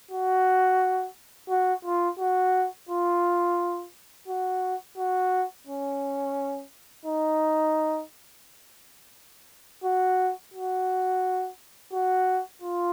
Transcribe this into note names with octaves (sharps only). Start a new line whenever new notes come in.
F#4
F#4
F4
F#4
F4
F#4
F#4
C#4
D#4
F#4
F#4
F#4
F4